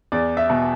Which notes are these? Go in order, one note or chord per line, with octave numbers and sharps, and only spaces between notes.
E2 D5
E5
B2